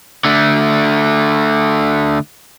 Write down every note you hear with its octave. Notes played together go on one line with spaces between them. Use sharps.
D3 A3